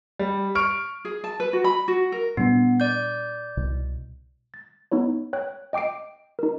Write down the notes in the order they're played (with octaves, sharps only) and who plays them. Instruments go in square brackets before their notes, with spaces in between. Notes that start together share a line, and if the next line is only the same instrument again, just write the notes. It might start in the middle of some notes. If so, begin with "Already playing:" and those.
[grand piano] G3
C#6 F6 D7
[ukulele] G#4
A5
B4
F#4
B5
F#4
A#4
[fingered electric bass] A#2 G3 D4 [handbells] B3
[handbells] D5 G6
[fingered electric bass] C2 B2
[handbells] A6
B3 D#4 E4 C#5
C#5 G5 F#6
D#5 G5 D6 C7 D7
D#4 A#4